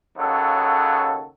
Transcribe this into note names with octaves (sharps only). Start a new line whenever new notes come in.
D#2 C#3 F#3 A4